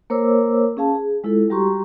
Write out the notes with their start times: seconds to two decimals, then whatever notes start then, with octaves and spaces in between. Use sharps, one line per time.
0.10 A#3 A#4 C5 C#5 D6 E6
0.77 C#4 G#4 F5 A5
0.95 G#4
1.24 G#3 E4 F4 A4
1.50 G3 F#4 G4 A#5 C6 C#6